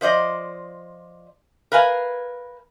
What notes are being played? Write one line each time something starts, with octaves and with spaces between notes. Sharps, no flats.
F3 C5 D5 D#5
A#4 B4 F5 G#5